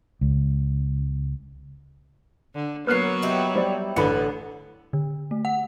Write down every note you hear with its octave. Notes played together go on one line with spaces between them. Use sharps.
C#2
D3
F#3 A#3 B3 B4 C#5 F6 F#6 C7
D#4 E4 G4
G3 C5 D5
A1 D3 B3 A4 B4 B5 C#7
D3
A3
F#5